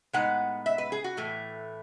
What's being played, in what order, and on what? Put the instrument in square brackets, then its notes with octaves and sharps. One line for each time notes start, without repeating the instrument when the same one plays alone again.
[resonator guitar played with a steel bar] A2 G#3 B3 D#4 F#5
E5
B4
G#4
F#4
A2 E3 A3